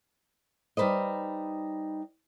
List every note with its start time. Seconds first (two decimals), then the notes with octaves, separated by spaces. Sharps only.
0.77 G3 D#4 B4 C5 D#5